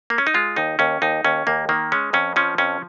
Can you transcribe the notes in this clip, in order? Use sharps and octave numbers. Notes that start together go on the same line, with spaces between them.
A#3
C#4
D#4
G#3 F4
D#2 D#4
D#2 C#4
D#2 D#4
D#2 C#4
D#2 A#3
D#3 A#3
G#3 C#4
F2 C#4
F3 C#4
F2 C#4